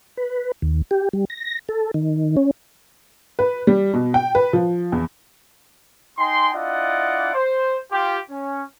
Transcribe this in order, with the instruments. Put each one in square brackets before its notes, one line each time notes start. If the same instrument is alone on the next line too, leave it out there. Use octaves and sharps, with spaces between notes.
[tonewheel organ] B4
D#2
G4
G3
A#6
A4
D#3
C#4
[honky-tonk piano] B4
G3
B2
G5
B4
F3
E2
[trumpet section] D#4 G5 G#5 C6
D4 E4 F4 D5 D#5 F#5
C5
F4 G4
C#4